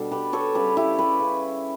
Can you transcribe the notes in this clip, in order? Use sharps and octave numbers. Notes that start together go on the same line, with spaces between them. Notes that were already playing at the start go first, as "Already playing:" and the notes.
Already playing: B2 G3 D4 A4
G4 B4
A4 C#5
C#3 G3 G4 B4
E4 G4
G4 B4
C#3